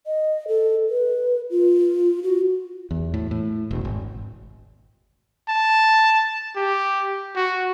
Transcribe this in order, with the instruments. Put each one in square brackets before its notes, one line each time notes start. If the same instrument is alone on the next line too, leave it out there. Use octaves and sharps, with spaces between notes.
[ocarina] D#5
A4
B4
F4
F#4
[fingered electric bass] E2
A2
A2
E1
G#1
[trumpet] A5
G4
F#4